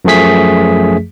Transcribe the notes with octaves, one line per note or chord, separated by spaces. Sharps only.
F#2 F3 A3 G#4 B6